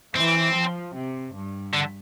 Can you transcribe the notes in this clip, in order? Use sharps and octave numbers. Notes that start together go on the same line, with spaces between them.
E3 C4
F3
C3
G2
D3